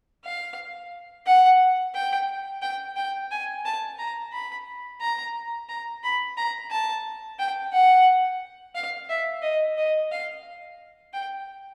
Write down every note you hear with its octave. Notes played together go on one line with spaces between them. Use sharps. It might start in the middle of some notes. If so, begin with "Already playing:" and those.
F5
F#5
G5
G5
G5
G#5
A5
A#5
B5
A#5
A#5
B5
A#5
A5
G5
F#5
F5
E5
D#5
D#5
F5
G5